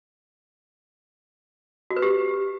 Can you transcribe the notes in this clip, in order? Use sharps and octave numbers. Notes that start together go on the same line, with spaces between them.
F#4
B4
G4